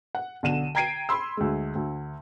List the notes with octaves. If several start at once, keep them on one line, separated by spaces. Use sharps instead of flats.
F#5
B1 D3 D#7 E7
G5 A#5 G#6 C7 D7 D#7
B5 C6 E6
D2 G#3
D2